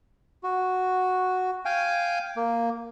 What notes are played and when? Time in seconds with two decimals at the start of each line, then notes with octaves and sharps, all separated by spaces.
0.43 F#4
1.65 F5 G5 G#5
2.37 A#3